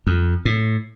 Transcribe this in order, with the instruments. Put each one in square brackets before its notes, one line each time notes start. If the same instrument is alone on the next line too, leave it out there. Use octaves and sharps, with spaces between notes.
[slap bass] F2
A2